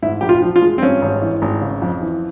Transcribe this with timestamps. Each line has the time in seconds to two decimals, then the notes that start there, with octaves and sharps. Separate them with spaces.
0.02 G#2 E4
0.21 A#1 G4
0.29 F4
0.42 F3
0.56 F4
0.62 G#3
0.78 C4
0.82 G2 C#4
1.02 G#1
1.22 E3
1.42 G#1
1.61 C#3
1.82 F2
2.01 E3